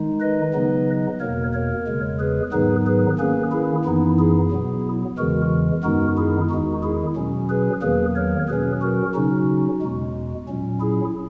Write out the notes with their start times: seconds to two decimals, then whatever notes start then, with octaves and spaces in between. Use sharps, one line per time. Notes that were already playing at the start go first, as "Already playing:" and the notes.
Already playing: D#3 G#3 D#4
0.21 B4 D#5
0.54 C#3 F#3 B3 D#4
1.20 E2 B2 A#3 A#4 C#5
1.53 A#4 C#5
1.87 E2 C#3 G#3
2.19 G#4 B4
2.52 G#2 D#3 F#3 B3 D#4 G#4 B4
2.87 G#4 B4
3.19 D#3 A#3 C#4 G#4 B4
3.52 E4 G#4
3.85 F#2 E3 B3 D#4 E4
4.19 E4 G#4
4.51 B2 F#3 B3
5.18 E2 C#3 E3 G#3 F#4 A#4
5.83 F#2 D#3 G#3 B3 D#4 F#4 A#4
6.17 E4 G#4
6.50 E2 D#3 G#3 D#4 F#4
6.83 E4 G#4
7.16 B2 F#3 C#4
7.49 G#4 B4
7.82 E2 D#3 F#3 A#3 G#4 B4
8.16 A#4 C#5
8.49 B2 F#3 C#4 G#4 B4
8.82 F#4 A#4
9.15 C#3 F#3 C#4 D#4 F#4
9.81 E2 B2 G#3
10.48 A#2 F#3 C#4
10.80 E4 G#4